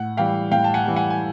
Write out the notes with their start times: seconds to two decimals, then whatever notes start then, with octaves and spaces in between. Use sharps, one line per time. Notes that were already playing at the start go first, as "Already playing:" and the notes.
Already playing: A2 F#5
0.17 E3 G3 F5 G5
0.51 A2 F5 G5
0.64 A5
0.74 F#5 G#5
0.86 E3 G3
0.96 F#5 G#5
1.10 G#5